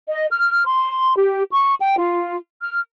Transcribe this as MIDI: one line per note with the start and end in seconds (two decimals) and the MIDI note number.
0.08 0.26 75
0.31 0.65 89
0.66 1.14 84
1.17 1.43 67
1.52 1.74 85
1.81 1.95 79
1.97 2.36 65
2.62 2.80 89